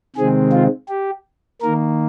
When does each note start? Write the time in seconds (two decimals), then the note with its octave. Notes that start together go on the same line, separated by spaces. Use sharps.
0.16 C3 D#3 G#3 C4 G#4
0.52 F4
0.89 G4
1.62 D#3 A#3 A#4